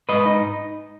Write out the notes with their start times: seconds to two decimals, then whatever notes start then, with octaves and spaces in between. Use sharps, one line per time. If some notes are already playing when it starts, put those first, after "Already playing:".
0.09 G#2 B4 D#5
0.26 D#4